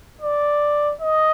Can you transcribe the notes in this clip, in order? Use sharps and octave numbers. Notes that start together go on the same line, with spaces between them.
D5
D#5